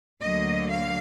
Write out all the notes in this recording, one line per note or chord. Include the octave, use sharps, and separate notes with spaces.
D2 D3 F#3 A#3 D#5
F5